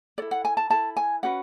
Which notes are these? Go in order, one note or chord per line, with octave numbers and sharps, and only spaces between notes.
E4 A4 D5
F#5
G#5
A5
E4 A4 A5
G#5
C#4 F#4 B4 F#5